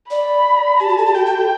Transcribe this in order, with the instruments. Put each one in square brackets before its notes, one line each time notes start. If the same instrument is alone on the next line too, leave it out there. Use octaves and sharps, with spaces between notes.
[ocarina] D5 [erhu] B5
[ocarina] G4 [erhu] A5
[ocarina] F#4
A4
G4
[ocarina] F#4 [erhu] G5
[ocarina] F#4
A4